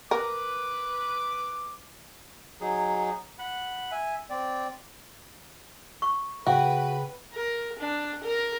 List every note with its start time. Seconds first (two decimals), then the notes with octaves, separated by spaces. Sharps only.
0.11 A#4 B4 D6
2.61 F#3 D#4 G#4
3.39 F#5 B5
3.92 E5 G#5
4.30 C4 D5
6.02 C#6
6.47 C#3 F#4 B4 G5
7.33 A#4
7.79 D4
8.24 A#4